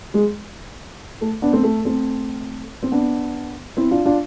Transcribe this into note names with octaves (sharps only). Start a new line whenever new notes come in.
G#3
A3
B3 D4
A3 C4
A3
A3 C4
C4
B3 D4
C4 E4
D4 F4
D4 F4